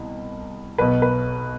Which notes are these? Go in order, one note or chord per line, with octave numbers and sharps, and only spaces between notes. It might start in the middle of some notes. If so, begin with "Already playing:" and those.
Already playing: C2 B2
B1 B2 B4
B4